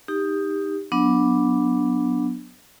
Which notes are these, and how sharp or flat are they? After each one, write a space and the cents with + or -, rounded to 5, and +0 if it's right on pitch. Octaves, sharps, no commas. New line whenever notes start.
D#4 +0 G4 +15
F#3 -20 B3 +0 D4 +0